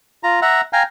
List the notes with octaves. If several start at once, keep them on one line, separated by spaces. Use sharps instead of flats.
F4 A#5
E5 F#5 A#5
F5 G5 G#5 A#5